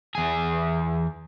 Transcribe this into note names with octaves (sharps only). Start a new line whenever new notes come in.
E2 G#4